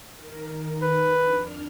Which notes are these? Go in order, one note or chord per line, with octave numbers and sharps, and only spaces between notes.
D#3 A#4
B4
F2 D4 F6